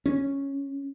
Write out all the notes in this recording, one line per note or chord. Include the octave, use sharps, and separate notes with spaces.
C#4